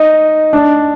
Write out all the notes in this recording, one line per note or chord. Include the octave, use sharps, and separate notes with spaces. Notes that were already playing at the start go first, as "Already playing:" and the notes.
Already playing: D#4
D4